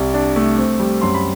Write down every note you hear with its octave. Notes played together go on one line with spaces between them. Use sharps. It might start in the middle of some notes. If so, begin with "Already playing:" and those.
Already playing: C2 G3
D4
A3
C4
G3
F#2 C6
B5